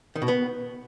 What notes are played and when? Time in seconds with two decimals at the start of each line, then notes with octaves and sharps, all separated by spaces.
0.16 D#3
0.22 B2
0.28 B3